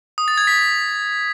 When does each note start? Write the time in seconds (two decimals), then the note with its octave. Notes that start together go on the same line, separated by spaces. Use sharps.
0.18 D#6
0.28 A6
0.38 G#6
0.47 B6